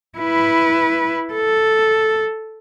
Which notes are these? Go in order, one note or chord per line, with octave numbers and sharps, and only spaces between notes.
E4 B4
A4